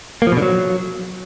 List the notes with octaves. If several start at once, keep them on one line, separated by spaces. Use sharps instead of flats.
A#3
F3
B2
D3
F#3